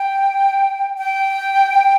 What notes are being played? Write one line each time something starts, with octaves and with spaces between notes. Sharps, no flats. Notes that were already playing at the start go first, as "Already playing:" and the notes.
Already playing: G5
G5